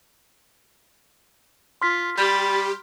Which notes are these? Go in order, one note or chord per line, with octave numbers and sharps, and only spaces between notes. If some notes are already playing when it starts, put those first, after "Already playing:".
F4 C6 F6 B6
G3 G4 B5 A6